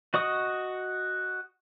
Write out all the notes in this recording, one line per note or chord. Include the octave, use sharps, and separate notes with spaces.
F#4 D#5 C#6 D#6